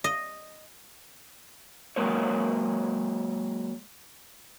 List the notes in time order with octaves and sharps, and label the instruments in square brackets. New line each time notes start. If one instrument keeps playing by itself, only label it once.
[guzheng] D#5
[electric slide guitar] F#3 G#3 A#3 A#4 B4 C#5